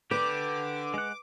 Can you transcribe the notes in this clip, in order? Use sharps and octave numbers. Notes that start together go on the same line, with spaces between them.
D3 G4 B4 D6
G#3 F#5